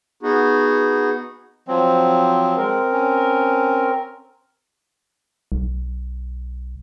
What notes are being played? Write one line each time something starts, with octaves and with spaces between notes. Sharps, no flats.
B3 D#4 F#4 G#4
F3 F#3 C4
G#3 C4 A#4
C#4
B1